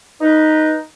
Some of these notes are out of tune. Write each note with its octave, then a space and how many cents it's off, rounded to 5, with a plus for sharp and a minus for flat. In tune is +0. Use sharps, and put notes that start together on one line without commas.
D#4 +0 B4 -20